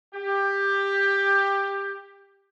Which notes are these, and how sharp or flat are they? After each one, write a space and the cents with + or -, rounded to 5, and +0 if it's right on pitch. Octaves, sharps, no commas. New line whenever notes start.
G4 +15